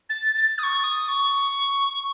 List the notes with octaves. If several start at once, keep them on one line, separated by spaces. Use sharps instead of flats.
A6
A6
D#6
C#6
D#6
C#6